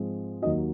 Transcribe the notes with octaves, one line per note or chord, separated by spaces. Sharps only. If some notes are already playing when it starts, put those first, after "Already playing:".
Already playing: G#2 F3 G#3 C4
D#2 D#3 F#3 D#5